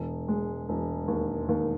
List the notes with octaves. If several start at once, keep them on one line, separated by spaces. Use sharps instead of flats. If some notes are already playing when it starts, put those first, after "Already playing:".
Already playing: E1
G#3
E1
D#2
D#2